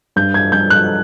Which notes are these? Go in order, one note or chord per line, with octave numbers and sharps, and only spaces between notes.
G2 G6
G#6
G2 G6
F#6